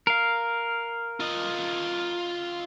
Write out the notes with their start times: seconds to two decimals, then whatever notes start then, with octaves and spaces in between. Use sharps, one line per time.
0.07 A#4 F5
1.20 F4 D#5